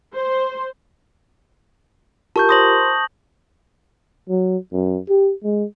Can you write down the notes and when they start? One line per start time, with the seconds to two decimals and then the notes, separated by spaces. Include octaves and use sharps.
0.14 C5
2.36 F4 G4 A#4 A5 C#6 G6
2.49 C5 B5 C6 D#6 A#6 F#7
4.29 F#3
4.73 F#2
5.09 G4
5.44 G#3